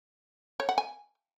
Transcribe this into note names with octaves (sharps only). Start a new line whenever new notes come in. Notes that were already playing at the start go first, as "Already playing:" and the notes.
C#5
F#5
G#5